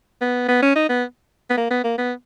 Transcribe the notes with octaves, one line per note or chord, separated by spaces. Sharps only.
B3
B3
C#4
D#4
B3
B3
A#3
B3
A#3
B3